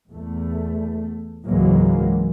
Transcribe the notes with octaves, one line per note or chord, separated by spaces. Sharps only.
E2 A3
C#2 G#2 E3 F#3 G#3 A#3